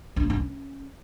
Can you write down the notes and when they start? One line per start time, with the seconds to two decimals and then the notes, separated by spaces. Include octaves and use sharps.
0.16 D4
0.23 A#3
0.30 D#4
0.37 C#4